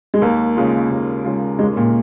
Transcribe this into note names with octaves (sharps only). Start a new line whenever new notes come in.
G#3
D#2 A#3
C#3 G#3 F4
D#2
C#3 G#3 F4
D#2 G#3
A#2